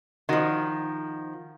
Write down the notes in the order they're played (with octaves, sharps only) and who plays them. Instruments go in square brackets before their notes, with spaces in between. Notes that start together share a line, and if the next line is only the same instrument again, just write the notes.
[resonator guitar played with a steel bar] D#3 F3 [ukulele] F#4 D#5 F#5